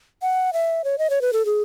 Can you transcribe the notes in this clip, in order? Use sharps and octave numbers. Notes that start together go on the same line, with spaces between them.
F#5
E5
C#5
D#5
C#5
B4
A4
G#4